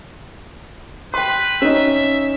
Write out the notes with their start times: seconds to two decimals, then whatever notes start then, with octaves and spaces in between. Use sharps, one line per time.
1.14 B4 G5 C6
1.62 C#4 D#4 E5